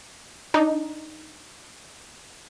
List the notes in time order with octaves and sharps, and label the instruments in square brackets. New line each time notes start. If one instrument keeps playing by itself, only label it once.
[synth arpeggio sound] D4 D#4